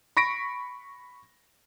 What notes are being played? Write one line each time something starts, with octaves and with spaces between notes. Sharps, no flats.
B5 C#6 A#6 B6 D7